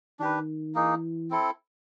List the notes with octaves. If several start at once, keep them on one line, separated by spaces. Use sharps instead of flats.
D#3 D4 G4 B4
E3 A#3 D#4 G#4
C4 E4 A4